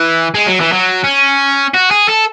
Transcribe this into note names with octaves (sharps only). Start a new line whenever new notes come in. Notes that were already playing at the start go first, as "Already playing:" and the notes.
Already playing: E3
G#3
F#3
E3
F#3
C#4
F#4
G#4
A4